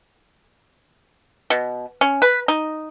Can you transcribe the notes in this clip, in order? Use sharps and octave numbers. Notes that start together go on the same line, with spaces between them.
B2
C#4
B4
D#4